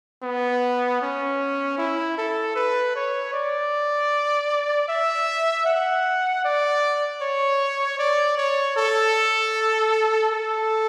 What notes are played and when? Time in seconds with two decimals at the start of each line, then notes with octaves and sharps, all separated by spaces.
0.23 B3
1.02 C#4
1.78 E4
2.18 A4
2.56 B4
2.95 C#5
3.33 D5
4.88 E5
5.66 F#5
6.45 D5
7.21 C#5
7.99 D5
8.38 C#5
8.76 A4
10.32 A4